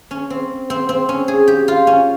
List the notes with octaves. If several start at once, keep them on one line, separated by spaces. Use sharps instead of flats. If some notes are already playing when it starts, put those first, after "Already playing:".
C#4
C4
C4
C4
C#4
G#4
G4
F4
C#4